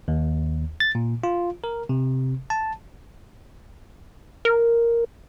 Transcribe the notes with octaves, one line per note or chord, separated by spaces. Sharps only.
D#2
A6
A#2
F4
A#4
C3
A5
A#4